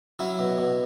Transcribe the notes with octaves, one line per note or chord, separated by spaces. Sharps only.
F#3 C#4 E4
B2
B2